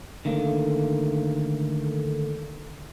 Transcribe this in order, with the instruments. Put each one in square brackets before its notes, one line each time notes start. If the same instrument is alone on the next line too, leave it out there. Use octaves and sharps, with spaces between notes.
[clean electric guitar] D3 D#3 A3 A#3